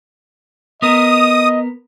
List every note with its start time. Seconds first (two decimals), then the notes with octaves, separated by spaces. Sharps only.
0.82 B3 A#4 D#5 D#6